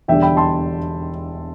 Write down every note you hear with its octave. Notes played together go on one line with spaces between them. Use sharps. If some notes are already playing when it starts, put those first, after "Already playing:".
E1 E2 D3 G3 D4 E5 G5
G5 B5
A5 C6